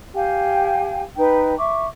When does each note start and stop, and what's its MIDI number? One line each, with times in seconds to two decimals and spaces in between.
0.15 1.02 67
0.15 1.02 77
0.15 1.02 79
0.15 1.02 80
1.16 1.54 63
1.16 1.54 71
1.16 1.54 79
1.58 1.85 76
1.58 1.85 85
1.58 1.85 86